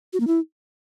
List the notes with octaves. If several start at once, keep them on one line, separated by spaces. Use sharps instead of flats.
F#4
A#3
E4